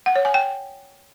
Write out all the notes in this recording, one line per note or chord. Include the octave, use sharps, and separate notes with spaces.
F#5
C#5
G#5
G5